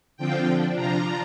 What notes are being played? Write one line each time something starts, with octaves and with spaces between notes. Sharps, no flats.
D3 F3 C4 F4 G5
D3 F3 D4
C3 F3 D4 F4 A#5